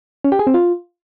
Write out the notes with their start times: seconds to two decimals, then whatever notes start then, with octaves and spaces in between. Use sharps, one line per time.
0.24 C#4
0.32 G4
0.39 G#4
0.47 C4
0.54 F4